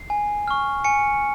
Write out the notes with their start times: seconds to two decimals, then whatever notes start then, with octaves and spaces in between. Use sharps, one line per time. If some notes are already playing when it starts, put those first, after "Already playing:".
Already playing: C7
0.10 G#5
0.48 C#6 F6
0.84 G#5 C#7